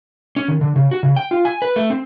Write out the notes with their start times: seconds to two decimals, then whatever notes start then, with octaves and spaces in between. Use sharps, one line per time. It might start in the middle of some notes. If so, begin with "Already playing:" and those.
0.36 C#4
0.48 D#3
0.61 D3
0.76 C#3
0.91 F#4
1.03 C#3
1.16 G5
1.31 F4
1.45 G#5
1.62 B4
1.76 A3
1.90 C4